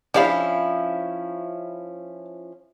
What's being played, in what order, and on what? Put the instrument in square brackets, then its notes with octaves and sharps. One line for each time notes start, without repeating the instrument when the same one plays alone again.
[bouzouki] F3 C#4 E4 [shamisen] D4 D5 F5